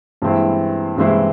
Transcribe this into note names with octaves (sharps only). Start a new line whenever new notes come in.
G2 E3 G#3 C4 E4
G2 E3 G#3 C4 E4